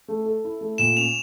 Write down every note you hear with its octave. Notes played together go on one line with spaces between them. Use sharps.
A3
A4
E4
A3
A#2 E7
C#4 F7